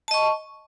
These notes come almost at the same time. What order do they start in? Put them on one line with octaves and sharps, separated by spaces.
A5 D#5 C#6